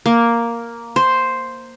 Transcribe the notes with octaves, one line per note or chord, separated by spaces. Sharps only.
A#3
C5